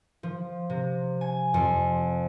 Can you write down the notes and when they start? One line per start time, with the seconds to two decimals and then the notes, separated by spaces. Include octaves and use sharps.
0.23 F3
0.70 C3
1.21 G#5
1.54 F2